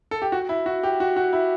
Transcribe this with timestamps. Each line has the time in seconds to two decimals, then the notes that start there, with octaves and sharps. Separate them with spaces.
0.11 A4
0.22 G4
0.32 F#4
0.49 E4
0.66 F#4
0.83 G4
1.00 F#4
1.17 F#4
1.33 E4